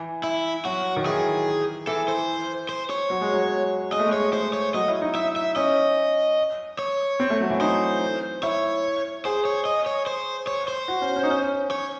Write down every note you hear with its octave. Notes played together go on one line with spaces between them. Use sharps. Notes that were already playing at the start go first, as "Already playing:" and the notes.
Already playing: E3
E4
F#3 F#4
D#3
E3 G#4
E3 A4
C5
C5
C#5
F#3
G#3
F#3
G#3 D#5
A3
G#3
C#5
C5
C#5
F#3 D#5
E4
D#4
E5
E5
C#4 D#5
C#5
C4
A3
F#3
E3
D#4 C5
E4 C#5
G#4 C5
C#5
D#5
C#5
C5
C#5
C5
F#4
C#4
C#4
D#4
C#4
C#5